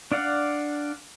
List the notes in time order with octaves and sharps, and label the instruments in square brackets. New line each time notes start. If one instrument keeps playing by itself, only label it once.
[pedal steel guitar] D4 D5 F5 F#5